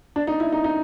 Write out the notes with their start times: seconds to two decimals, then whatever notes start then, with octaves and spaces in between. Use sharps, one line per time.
0.16 D4
0.27 D#4
0.40 E4
0.52 D#4
0.64 D#4